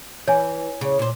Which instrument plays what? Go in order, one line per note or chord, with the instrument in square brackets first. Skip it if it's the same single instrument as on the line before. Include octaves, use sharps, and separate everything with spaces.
[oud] E3 [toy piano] C#5 G#5
[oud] C#3
A#2 C5